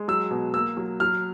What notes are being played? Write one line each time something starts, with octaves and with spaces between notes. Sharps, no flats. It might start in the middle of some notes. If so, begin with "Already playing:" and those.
Already playing: G#3
F#3 E6
B2
A#3 E6
F#3
F#3 F6